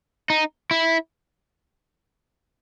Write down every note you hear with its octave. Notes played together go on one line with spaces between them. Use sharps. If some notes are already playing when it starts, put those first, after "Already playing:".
D#4
E4